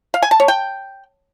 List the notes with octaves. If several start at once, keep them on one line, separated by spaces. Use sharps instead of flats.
F5
G#5
A5
C#5
G5